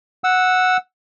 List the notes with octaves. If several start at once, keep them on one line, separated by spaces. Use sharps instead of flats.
F#5 E6